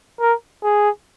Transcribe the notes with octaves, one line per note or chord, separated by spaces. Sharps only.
A#4
G#4